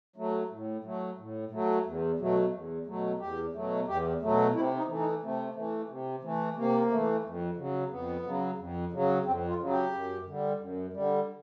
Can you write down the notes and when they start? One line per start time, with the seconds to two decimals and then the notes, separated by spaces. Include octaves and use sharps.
0.16 F#3 A3
0.50 A2
0.84 F#3 A3
1.18 A2
1.51 F#3 A3
1.85 E2
2.19 B2 F#3 A3
2.52 E2
2.86 B2 F#3 A3
3.19 E2 G4
3.54 B2 F#3 A3
3.87 E2 G4
4.21 B2 F#3 A3
4.53 C3 E4
4.76 D#4
4.87 E3 A3
4.99 D#4
5.22 C3 A3
5.55 E3 A3
5.89 C3
6.22 E3 A3
6.56 C3 A#3
6.90 E3 A3
7.23 F2
7.57 C#3 F#3
7.90 F2 B3
8.24 C#3 F#3
8.58 F2
8.92 C#3 F#3
9.25 F2 C4
9.48 F4
9.59 C#3 F#3
9.70 G4
9.92 F#2
10.26 D3 G3
10.60 F#2
10.93 D3 G3